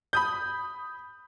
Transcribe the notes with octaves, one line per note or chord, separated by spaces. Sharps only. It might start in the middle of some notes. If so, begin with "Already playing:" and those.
B5 D#6 G6